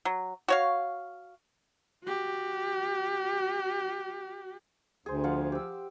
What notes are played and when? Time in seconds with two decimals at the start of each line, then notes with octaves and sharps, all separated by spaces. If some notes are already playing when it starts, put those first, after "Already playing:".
0.05 F#3
0.48 F#4 C#5 F5
2.04 F#4 G4
5.06 D2 G#4 C5
5.24 F3 F5 F#5
5.52 G4 E6